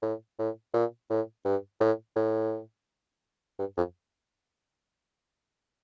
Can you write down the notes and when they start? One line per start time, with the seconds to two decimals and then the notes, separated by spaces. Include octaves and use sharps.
0.02 A2
0.39 A2
0.74 A#2
1.10 A2
1.45 G2
1.80 A2
2.16 A2
3.59 G2
3.77 F2